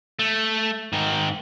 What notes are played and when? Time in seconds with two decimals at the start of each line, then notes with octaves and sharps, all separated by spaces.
0.19 A3
0.93 G#2 D#3